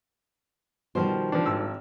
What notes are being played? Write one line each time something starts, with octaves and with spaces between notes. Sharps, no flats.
B2 D#3 F3 G3 C5
F3 D4
G#1 E6